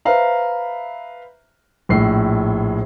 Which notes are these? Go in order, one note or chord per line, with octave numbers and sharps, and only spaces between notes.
B4 C5 E5 F5 A#5
A#1 A2 C7